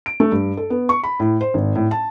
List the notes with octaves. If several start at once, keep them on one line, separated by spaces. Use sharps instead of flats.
D7
A3
G2
A4
B3
C#6
B5
A2
C5
G#1
A2
A5